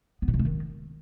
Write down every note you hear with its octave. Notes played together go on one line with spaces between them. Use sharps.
B3
A#2
C3
A3
D#3